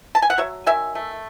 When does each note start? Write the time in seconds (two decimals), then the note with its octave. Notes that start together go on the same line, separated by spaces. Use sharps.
0.15 A5
0.22 G#5
0.30 F#5
0.38 F#3 C#5 E5
0.66 D#3 E5 G#5
0.95 A3